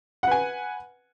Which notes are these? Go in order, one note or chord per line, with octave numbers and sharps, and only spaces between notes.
B4 F#5 G#5